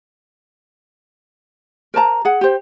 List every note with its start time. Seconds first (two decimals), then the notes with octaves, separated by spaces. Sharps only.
1.94 A#4 C5 A5 A#5
2.25 G#4 F#5
2.41 G4 C5